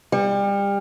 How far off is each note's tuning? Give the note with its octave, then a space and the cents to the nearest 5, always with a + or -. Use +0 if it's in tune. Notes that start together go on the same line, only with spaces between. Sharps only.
G3 +30